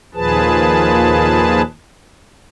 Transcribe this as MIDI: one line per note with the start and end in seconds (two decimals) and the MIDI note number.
0.15 1.62 39
0.15 1.62 46
0.15 1.62 53
0.15 1.62 68
0.15 1.62 71
0.15 1.62 81